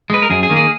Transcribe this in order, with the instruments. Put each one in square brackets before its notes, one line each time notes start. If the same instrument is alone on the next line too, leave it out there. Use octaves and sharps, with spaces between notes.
[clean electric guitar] G#3 B4
A#4
F#2 G#4
G#4
D#3 A#3
G#4